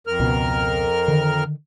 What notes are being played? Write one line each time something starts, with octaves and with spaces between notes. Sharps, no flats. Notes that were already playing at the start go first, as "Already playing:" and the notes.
F2 A#4 F6
C#2 B2
D3 D#3